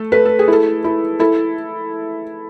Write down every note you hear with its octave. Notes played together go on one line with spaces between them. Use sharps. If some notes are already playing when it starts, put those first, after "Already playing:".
Already playing: A3 A4
A3 B4
A4
G#4
E4 A4
E4
E4 A4